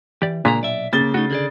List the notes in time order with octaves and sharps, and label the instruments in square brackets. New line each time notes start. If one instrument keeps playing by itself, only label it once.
[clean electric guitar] E3 [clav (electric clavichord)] G4 D5
[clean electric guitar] C#2 A#3 A#5 [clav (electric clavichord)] A#2 D4 G#4 [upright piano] B6
[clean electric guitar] B1 D5 E5
[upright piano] C#3 A6 G7 [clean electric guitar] A#3
[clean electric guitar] A3 D#4 [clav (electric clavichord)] F#4
[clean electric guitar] D3 G#4 D5